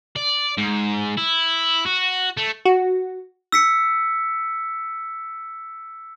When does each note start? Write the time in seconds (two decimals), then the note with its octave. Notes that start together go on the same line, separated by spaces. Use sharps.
0.16 D5
0.58 G#2
1.18 E4
1.87 F#4
2.37 A3
2.65 F#4
3.52 E6 B6 C#7